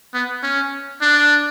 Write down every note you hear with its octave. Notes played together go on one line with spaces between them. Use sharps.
B3
C#4
D4